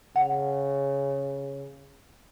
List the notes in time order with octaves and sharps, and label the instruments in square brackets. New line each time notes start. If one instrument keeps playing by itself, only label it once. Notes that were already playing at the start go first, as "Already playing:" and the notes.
[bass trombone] C#3 [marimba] F#5